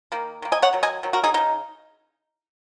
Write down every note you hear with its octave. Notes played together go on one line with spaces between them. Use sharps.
D#3 A#3
D#3 A#3
D#5 G#5
C#5 F#5
D#3 F#3
D#5 G#5
D#3 F#3
F#4 A#4
D#4 G#4
C#3 A#3 D#4